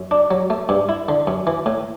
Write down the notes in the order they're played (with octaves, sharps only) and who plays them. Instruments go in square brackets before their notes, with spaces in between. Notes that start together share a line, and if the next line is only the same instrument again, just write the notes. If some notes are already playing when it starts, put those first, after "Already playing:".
Already playing: [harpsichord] F#2
D4
F#3
A3
G2
E4
D3
F#2
E3
A2